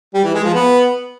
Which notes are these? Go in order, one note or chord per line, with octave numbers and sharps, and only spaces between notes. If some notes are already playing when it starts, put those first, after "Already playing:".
G3
E3
G#3
F3
B3